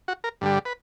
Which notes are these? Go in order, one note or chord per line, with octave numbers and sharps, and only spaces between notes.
F#4
A#4
G2 D3 G3
B4